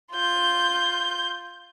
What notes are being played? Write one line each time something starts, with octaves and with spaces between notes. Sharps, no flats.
F4 G6